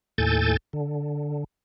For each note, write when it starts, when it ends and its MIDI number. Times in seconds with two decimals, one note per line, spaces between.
0.18 0.57 39
0.18 0.57 45
0.18 0.57 69
0.18 0.57 80
0.18 0.57 91
0.18 0.57 93
0.73 1.44 50